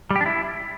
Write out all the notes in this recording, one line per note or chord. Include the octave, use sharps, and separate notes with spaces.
G3
G4
D4
E4